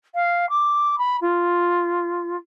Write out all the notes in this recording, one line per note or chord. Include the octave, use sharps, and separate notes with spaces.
F5
D6
B5
F4